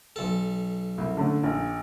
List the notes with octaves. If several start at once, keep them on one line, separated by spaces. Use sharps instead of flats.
B1 A4
C2
D3 A3 C#4
A#1